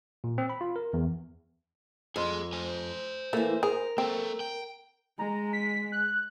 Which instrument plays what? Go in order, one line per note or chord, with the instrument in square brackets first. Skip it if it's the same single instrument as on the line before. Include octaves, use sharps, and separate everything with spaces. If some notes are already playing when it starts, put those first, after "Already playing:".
[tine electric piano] A#2
C4
B5
F4
A#4
E2
[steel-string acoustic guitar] F2 [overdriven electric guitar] G#4 C6
[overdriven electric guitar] C5 G#5
[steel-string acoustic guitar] E3 A#3 [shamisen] A3
[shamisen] G#4 [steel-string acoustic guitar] A#4
[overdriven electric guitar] A#3 A4 [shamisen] C4
[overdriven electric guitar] G5
[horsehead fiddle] G#3 [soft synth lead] A#5
[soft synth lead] B6
F#6